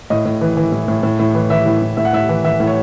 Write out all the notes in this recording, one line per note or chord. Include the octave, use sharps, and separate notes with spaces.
A2 D#5
A2
E3
E3
A2
A2
A2
A2
E3
E3 E5
A2
A2
A2 E5
F#5
A2 E5
E3
E3 E5
A2
C#5